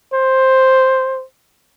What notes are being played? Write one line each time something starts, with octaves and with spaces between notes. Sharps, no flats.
C5